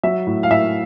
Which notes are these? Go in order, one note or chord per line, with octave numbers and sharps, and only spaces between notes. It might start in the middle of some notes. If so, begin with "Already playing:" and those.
F#3 E5
A2
F5
A2 E5